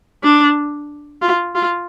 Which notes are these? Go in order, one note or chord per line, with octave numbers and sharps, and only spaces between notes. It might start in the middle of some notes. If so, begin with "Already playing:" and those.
D4
F4
F4